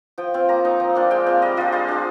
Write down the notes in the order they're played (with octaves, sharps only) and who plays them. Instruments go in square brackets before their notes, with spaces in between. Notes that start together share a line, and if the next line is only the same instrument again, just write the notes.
[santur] F3 G5
C4 F4
A#3 A#5
D#4
F3
A#3 D4 F4
G#3 G5
C4 F4
G3 D#5
D4 F4 D#5
G#3 C5
D4 F4